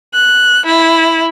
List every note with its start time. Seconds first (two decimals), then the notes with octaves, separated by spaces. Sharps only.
0.13 F#6
0.65 E4